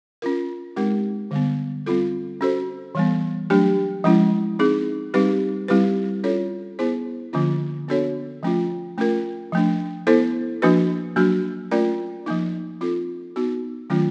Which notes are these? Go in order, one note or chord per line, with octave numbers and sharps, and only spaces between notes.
C#4 F4 A#4
G#3 C4 D#4 G4 A#4
D3 G3 B3
G3 C4 F4 A4
C#4 F#4 A4 C5
E3 G3 B3
F#3 A3 D4 G4
F3 G#3 C#4 E4
C4 D#4 G#4
G3 C4 D#4 G4 B4
G3 C4 E4 G4 B4
C#4 F4 A4 C#5
B3 E4 G#4 C5
D3 F3 A#3 C#4 F4
B3 D4 F#4 A4 C#5
F3 A3 C#4 F4
A3 C#4 F4 A#4
F3 A3 D4
B3 E4 A4 C5
F3 A#3 D4 F#4 B4
F#3 A#3 D4 F#4
A3 C#4 F4 A#4 D5
F3 A#3 D#4
C4 F4 A4
B3 D#4 F#4
D#3 F#3 A3 C#4 F4